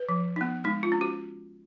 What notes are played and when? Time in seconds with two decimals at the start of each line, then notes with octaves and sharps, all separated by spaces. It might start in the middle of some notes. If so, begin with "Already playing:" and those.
Already playing: B4
0.09 F3
0.36 B3 D#4
0.64 G#3 D#4
0.83 F4
0.92 C#4
1.01 F#4